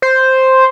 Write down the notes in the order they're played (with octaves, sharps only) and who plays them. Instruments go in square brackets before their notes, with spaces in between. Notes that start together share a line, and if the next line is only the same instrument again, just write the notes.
[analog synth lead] C5